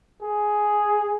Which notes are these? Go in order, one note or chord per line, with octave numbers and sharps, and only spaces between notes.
G#4